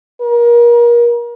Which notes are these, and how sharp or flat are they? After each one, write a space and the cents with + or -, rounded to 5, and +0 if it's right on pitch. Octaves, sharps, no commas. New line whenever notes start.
A#4 +30